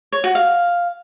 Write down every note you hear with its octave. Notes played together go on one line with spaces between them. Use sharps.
C#5
F#4
F5